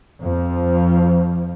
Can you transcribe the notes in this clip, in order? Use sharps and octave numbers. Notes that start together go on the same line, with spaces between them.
F2 F3